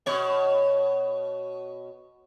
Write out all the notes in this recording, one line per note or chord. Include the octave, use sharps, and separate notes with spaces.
B2 C#5